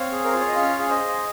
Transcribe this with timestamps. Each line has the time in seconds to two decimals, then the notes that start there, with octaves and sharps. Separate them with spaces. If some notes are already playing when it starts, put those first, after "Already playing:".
Already playing: C4 C#5 F5
0.11 G#4
0.25 A#4
0.32 F4 C5
0.40 C#5
0.48 D#5
0.56 C#4 C#5 F5
0.79 G#4 F5
0.89 C5 D#5
1.00 G#4